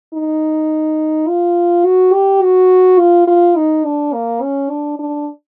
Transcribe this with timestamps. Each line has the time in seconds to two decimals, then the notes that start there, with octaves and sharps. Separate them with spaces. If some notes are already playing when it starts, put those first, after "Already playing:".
0.14 D#4
1.28 F4
1.85 F#4
2.14 G4
2.42 F#4
2.99 F4
3.27 F4
3.56 D#4
3.84 D4
4.13 A#3
4.42 C#4
4.70 D4
4.99 D4